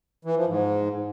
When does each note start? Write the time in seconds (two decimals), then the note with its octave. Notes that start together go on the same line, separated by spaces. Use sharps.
0.25 E3
0.36 F3
0.47 G#2